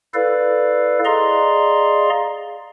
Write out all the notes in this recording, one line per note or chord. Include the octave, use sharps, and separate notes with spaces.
E4 A4 B4 D5 F5
G#4 D5 D#5 F5 A#5 C6